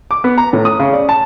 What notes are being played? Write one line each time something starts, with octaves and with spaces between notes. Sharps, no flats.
D6
B3
A#5
A2
D#6
C#3
D5
A5